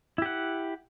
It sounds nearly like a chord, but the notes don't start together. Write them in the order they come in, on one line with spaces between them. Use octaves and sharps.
E4 G4 F#5